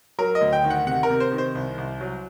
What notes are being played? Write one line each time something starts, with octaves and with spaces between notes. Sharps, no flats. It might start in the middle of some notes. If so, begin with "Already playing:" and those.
F#3 A#4
D#5
D2
G5
D#3
F#5
C3 F#5
A#4
C3
C5
D#3
C5
C2
C2
F#3